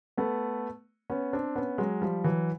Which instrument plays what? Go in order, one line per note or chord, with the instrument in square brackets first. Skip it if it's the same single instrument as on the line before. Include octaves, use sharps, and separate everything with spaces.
[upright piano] A3 B3
B3 C#4
C4 D4
B3 C#4
F#3 G#3
F3 G3
E3 F#3